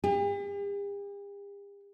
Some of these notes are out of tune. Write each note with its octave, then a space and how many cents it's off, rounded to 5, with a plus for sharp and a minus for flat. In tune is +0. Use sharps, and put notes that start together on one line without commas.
G4 +45